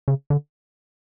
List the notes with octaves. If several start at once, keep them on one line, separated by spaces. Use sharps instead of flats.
C#3
D3